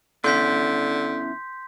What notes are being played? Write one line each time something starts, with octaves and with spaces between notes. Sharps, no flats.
D3 B3 C#4 E4 C6 G6 B6